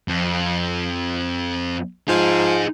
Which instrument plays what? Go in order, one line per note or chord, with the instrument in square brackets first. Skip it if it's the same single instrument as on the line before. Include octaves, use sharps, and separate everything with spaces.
[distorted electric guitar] F2
[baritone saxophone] F3 [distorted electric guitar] D#4 G#4